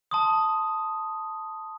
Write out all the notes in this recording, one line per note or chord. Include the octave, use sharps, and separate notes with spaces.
A5 C6 D#6